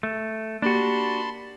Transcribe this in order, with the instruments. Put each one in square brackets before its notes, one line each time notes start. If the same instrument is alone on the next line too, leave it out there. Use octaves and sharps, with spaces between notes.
[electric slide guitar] A3
[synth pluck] A#3 G4 [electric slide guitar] D4 F#4 [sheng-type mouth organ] A5 B5 C6